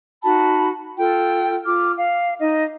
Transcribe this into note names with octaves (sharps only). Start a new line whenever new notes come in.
D#4 F#4 A5 B5
F4 A4 G5
F4 D6 F6
F5
D#4 D#5